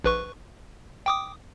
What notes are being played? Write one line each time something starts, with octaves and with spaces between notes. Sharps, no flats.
A#1 B4 C#6
G5 D6 D#6